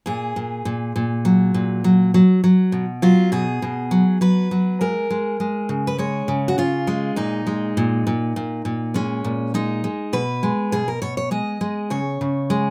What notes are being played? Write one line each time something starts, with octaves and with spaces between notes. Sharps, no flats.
A#2 G#4
A#2
A#2
A#2
F#3
A#2
F#3
F#3
F#3
B2
F#3 F4
B2 G#4
B2
F#3
F#3 B4
F#3
G#3 A#4
G#3
G#3
C#3
B4
G#3 C#5
C#3
F#4
C#3 F4
G#3
A#2 D#4
G#3
A#2
A#2
A#2
A#2
G#3 C#4
A#2
G#3 D#4
G#3
B2 B4
G#3
B2 G#4
A#4
B2 C#5
C#5
G#3 D#5
G#3
C#3 C#5
C#3
G#3